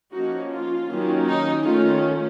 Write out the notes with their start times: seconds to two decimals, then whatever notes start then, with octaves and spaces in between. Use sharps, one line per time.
0.13 F3 A#3 C#4 D#4 F#4
0.51 F4
0.88 D#3 F#3 A#3 C#4
1.26 D#4
1.63 D#3 A3 C#4 F4